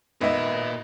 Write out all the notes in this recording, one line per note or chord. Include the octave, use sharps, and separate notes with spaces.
G#1 A#2 B3 D#4 A#4 B4 D#5 E5